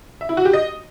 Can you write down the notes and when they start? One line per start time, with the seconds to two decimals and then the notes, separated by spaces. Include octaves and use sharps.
0.21 E5
0.29 E4
0.37 F#4
0.45 G4
0.53 D#5